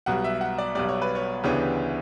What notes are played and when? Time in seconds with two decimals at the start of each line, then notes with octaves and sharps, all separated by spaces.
0.06 B1 B2 G3 F#5
0.24 E5
0.41 F#5
0.58 D5
0.75 B1 B2 G3 D5
0.89 C#5
1.02 B4
1.15 C#5
1.44 D2 C#3 E3 B3 D4 G4
1.60 G4